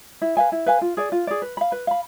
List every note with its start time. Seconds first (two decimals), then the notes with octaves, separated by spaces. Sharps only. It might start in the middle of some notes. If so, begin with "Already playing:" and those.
0.22 E4
0.37 B4 F5 G#5
0.52 E4
0.66 B4 F5 G#5
0.81 F4
0.97 G#4 D5
1.12 F4
1.27 G#4 D5
1.42 B4
1.57 F5 B5
1.72 B4
1.87 F5 B5